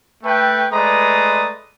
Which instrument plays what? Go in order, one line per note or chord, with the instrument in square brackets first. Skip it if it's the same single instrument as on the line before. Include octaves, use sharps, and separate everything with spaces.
[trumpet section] A3 B4 G5
G#3 A3 B4 D5 A#5 D#6